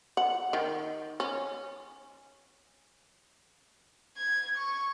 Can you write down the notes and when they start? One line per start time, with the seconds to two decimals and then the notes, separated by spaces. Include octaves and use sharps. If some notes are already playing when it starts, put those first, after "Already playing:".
0.17 F#5
0.53 D#3
1.20 C#4
4.17 G#6
4.57 C#6